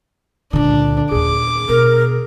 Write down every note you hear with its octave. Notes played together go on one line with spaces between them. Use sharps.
C#2 A#2 D3 D4
D#2 A#2 G#4 D6
B2 A#4